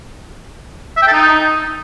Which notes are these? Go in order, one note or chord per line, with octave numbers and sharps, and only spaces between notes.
E5
G5
A4
D#4